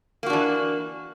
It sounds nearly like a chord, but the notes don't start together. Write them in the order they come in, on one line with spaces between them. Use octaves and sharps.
A#3 F#4 D4 E3